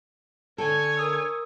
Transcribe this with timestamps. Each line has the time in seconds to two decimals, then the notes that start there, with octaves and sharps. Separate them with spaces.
0.58 D3 D4 A4 C#5 G#5
0.97 A#4 D#6 E6